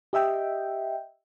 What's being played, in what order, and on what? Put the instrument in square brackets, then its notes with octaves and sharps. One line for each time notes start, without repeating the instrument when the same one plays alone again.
[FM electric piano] G4 D#5 E5 G5